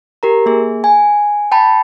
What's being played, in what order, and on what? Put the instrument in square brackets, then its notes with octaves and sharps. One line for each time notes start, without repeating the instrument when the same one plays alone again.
[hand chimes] G4 A#4 A#5
A#3 G#4
G#5
G5 A5 B5